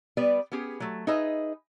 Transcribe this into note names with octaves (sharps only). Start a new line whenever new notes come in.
G3 B3 B4 D5
B3 C#4 G4 G#4
F#3 A3
D#4 G#4 B4 D#5 E5